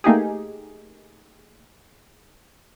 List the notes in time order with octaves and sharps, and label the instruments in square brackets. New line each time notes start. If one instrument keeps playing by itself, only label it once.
[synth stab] A3 A#3 D#4 G4 G#4